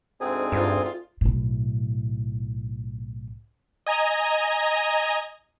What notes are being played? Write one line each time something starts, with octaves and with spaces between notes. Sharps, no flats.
D2 G#2 C4 G#4 G#5
G2 F4
B1 A2
D#5 G#5 A#5